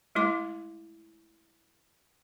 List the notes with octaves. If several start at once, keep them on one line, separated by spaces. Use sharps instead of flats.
G#3 A3 E4 C6 D6